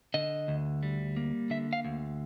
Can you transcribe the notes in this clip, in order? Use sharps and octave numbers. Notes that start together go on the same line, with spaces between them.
D3 D#5
D2
G3
A#3
D3 E5
F5
D2